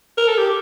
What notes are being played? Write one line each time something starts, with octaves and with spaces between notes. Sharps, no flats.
A#4
A4
G4